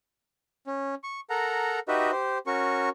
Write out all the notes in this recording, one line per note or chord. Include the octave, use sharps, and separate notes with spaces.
C#4
C#6
A4 A#4 F#5 A#5
D#4 F#4 G4 B4 D#5 E5
G4 C5
C#4 F#4 A#4 C#6